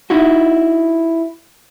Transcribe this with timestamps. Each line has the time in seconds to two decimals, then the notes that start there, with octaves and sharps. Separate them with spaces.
0.10 D#4 E4 F#4